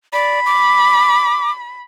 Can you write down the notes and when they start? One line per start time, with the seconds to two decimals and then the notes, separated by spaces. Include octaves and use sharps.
0.13 D5 B5
0.46 D6